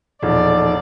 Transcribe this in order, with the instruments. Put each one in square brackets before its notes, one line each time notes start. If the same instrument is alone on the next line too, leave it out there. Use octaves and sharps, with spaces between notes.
[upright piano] E1 [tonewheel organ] A#2 F3 [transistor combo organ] D#4 A4 [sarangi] D5